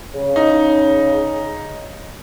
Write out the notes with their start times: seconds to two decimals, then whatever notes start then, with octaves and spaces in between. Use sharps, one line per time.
0.14 C#3
0.36 D#4